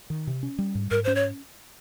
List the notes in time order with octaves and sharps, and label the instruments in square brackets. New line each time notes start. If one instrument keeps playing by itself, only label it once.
[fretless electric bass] D#3
C3
C#4
G3
G#2
[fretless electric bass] G#2 [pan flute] A#4
[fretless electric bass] C#4 [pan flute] C5
[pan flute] C#5